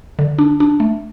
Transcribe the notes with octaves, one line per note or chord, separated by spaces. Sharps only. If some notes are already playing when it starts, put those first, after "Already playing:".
D3
D4
D4
A3